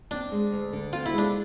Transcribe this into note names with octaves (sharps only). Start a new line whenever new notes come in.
C4 D4
G#3
D2
D3
C4 F4
E4
G#3 D4